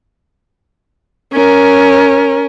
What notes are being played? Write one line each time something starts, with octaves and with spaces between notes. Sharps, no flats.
C#4 A#4